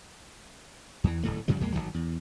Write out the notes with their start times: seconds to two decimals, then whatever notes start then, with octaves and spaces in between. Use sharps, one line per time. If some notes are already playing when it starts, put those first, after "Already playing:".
1.04 E2 E3
1.23 D1 C2 A2 A3
1.48 F#2 C#3 F3 G3
1.60 A#1 E2 G#3 A#3
1.73 G1 E2 D#3 F#3
1.94 E2